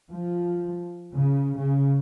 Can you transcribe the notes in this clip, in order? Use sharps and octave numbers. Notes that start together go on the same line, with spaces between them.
F3
C#3
C#3